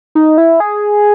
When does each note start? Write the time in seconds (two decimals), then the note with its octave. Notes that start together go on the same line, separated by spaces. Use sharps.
0.15 D#4
0.38 E4
0.60 G#4